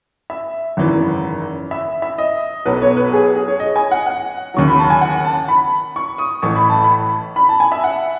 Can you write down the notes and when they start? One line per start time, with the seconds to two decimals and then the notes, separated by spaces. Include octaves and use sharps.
0.30 E5
0.77 G#1 F#2 C#3 E3
1.71 E5
2.02 E5
2.18 D#5
2.65 B1 B2 F#3 B4
2.82 C#5
2.97 B4
3.13 G#4
3.36 G#4
3.48 C#5
3.60 D#5
3.76 G#5
3.91 F#5
4.06 F#5
4.54 D#2 C#3 F#3 C#6
4.68 B5
4.79 A5
4.90 G#5
5.01 F#5
5.25 A5
5.49 B5
5.96 C#6
6.18 D#6
6.42 A1 A2 E3 C#6
6.56 B5
6.70 A5
6.84 B5
7.36 B5
7.49 A5
7.60 G#5
7.72 E5
7.84 F#5